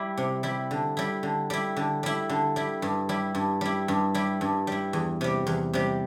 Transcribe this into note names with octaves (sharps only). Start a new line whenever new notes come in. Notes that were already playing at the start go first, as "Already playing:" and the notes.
Already playing: G3 E4
C3
G3 E4
D3
G3 E4
D3
G3 E4
D3
G3 E4
D3
G3 E4
G2
G3 E4
G2
G3 E4
G2
G3 E4
G2
G3 E4
E2
C3 G3
E2
C3 G3